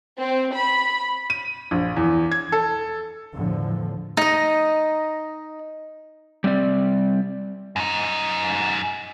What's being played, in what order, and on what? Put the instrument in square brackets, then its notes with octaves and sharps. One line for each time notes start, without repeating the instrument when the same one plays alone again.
[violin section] C4
B5
[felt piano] D#7
A#1
E2
G#6
A4
[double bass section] E2 A2 D3 F3
[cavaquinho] D#4 D#5
[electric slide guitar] G3 C4 D5
[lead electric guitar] F#2 D#4